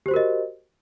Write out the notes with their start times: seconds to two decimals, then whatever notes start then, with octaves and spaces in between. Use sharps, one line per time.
0.06 G4
0.08 C5
0.11 F#4
0.14 A#4
0.16 D#5